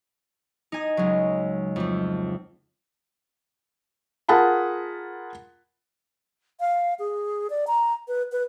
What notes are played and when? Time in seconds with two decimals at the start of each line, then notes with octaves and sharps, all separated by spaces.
0.72 D#4 G#5 D#6
0.97 C#2 F#3
1.76 F2 A3
4.29 F4 G#4 A#4 F#5 A5 B5
6.60 F5
6.99 G#4
7.50 D5
7.67 A#5
8.08 B4
8.32 B4